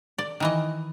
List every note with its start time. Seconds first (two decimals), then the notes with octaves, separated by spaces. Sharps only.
0.18 D5
0.40 D#3 E3 D#5